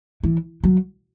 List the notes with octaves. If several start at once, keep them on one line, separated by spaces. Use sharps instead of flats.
E3
F#3